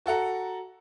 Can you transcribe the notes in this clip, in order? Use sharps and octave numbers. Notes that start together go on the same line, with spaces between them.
F#4 A4 F#5 A#5